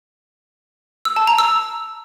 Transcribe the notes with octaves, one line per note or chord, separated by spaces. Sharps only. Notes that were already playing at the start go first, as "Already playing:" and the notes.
E6
A5
A#5
E6